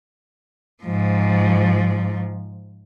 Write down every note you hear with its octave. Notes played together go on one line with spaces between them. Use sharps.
G#2 F3